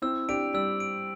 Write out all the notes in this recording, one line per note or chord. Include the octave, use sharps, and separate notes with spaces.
C4 E4 E6
D4 G4 D7
G3 E6
D7